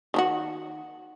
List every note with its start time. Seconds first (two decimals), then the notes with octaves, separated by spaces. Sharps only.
0.14 D#3 D4 F#4